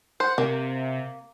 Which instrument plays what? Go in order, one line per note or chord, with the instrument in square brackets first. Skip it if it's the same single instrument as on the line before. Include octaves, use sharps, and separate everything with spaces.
[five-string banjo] C5 [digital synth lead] F#5
[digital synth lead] C3 [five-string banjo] A#3